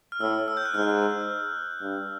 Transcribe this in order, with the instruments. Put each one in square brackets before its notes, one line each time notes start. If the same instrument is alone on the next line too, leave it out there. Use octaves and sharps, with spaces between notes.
[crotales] F6
[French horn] A2 [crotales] E6
[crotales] E6
G6
F#6
[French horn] G#2 [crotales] F6
[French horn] G2